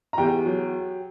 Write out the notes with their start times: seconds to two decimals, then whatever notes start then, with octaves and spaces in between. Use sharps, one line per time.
0.13 A#5
0.18 E2 G4 G5
0.46 F#3